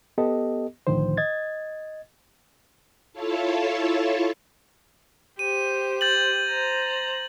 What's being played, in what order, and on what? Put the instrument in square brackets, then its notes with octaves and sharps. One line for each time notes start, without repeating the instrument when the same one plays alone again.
[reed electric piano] B3 G4 A4 D#5
C2 A2 D3 D#3 F3 C5
D#5 G#6 A6
[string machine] E4 F4 A4 C#5 F5 A5
[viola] G4 C5 [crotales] D#7
[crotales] G6 A6 F#7
[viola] C5 A#5